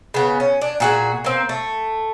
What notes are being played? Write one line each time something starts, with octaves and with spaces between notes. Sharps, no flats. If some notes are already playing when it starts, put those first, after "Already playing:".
C#3 B3
C#4
D4
A#2 F#4 G#4
A#3 C4
A3